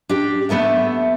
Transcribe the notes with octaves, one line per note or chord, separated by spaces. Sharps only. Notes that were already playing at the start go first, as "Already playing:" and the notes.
D4 G4
A3 B3 A4 E5